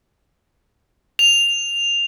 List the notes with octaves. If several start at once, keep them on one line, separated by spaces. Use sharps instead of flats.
F7